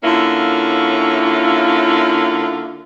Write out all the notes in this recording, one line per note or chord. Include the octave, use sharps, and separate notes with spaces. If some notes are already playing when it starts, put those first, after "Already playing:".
D3 A#3 C#4 E4 F4